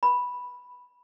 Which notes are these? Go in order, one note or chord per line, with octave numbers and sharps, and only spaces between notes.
B5